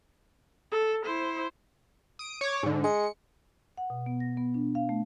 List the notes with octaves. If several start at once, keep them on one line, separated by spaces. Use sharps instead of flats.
A4
E4 C5
D#6 D7
C#5 D6
G#2 D3
G#3 C#7
F#5
B2
B3
A#6
B3
D4
F5
A3